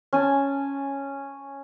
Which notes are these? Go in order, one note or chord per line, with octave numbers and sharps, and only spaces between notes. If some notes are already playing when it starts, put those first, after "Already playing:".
C#4 G#5 A5